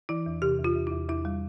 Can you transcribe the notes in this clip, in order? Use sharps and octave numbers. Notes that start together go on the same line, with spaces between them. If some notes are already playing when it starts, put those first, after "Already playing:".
E3 E4
E2
C3 G4
E2
F4
E2
E2 E4
E2 E4
G3